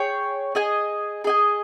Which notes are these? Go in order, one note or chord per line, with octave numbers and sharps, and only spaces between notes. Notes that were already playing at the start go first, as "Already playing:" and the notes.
Already playing: G#4 C#5 G5
G#4 D#5 G#5
G#4 D#5 G#5